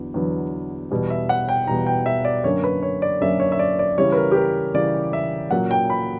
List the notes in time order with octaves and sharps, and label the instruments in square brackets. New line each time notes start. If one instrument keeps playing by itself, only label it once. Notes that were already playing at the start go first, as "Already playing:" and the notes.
Already playing: [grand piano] E2 D3 F#3 B3
E2 D3 F#3 B3
E2 B2 G3 B3
E5
F#5
G5
E2 B2 G3 B3 A#5
G5
E5
D5
F#2 D3 A#3 C#4 C#5
B4
C#5
D5
F#2 D3 A#3 C#4 E5
C#5
E5
D5
D5
C#3 E3 G3 C#5
B4
A#4
G4
A#4
C#3 E3 G3 D5
E5
A#2 F#3 A#3 C#4 F#5
G5
B5